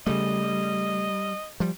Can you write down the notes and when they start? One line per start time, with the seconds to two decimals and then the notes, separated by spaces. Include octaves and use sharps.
0.07 C#3 G3 A3 D#5
1.60 F3 G3